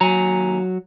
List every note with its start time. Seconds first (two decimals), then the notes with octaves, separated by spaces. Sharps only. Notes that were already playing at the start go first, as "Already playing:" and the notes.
0.01 D#2 F#3 G#5 A#5